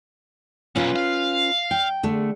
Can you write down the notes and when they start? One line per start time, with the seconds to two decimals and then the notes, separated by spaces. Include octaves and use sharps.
0.76 B1 A#2 C#4 F4 B4
0.96 F5
1.71 G5
2.03 D3 A3